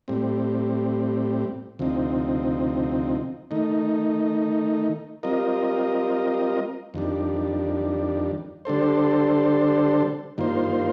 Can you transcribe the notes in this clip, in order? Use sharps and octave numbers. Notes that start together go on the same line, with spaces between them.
A2 G3 C4
D2 C3 F3 C4 D#4
D#3 A3 D#4
G3 C4 F4 A#4 D#5
F2 D#3 G3 D4
D3 G3 D4 A4 C5
G2 D#3 A#3 F4 C5